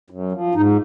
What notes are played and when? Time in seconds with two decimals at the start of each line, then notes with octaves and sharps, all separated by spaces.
0.10 F#2
0.32 F3
0.55 G#2 D#4